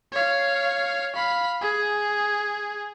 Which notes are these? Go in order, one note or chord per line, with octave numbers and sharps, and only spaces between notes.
C#5 F5
F5 B5
G#4